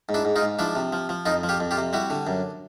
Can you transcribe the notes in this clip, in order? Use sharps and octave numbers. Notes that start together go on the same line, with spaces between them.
G#2
D4 E4
G#2
D#4 F4
G#2
F3 D4 E4
C3
F3
F3
F2 D#4 F4
F3
F4 G4
F2
F4 G4
C3
G3 E4 F#4
D3
F#2